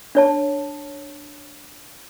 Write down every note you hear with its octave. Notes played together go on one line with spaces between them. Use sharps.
D4 C#5 A5